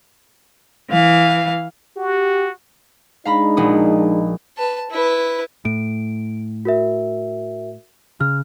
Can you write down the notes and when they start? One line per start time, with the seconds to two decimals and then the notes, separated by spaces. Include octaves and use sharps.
0.91 E3 F5
1.97 F#4 G4
3.25 G#3 D4 D#4 F5 A#5 B5
3.57 A#1 F#4 D#6
4.58 B4 A5
4.91 E4 B4
5.65 A2 D7
6.65 F#4 A#4 E5
8.21 C#3 F6